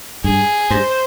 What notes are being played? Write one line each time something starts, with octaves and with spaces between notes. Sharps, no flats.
G2 G#4
G2 C5